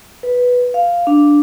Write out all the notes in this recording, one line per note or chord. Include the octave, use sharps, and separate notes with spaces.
B4
F5
D4